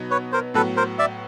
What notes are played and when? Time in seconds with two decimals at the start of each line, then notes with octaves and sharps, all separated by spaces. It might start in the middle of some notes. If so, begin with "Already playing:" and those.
Already playing: B2 F#3 B3 D#4
0.11 B4 C#5
0.32 A#4 C5
0.54 A2 F#3 B3 A4 B4
0.77 A#4 C5
0.99 D5 E5